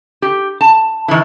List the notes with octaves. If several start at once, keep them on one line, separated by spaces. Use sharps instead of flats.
G4
A5
D#3 E3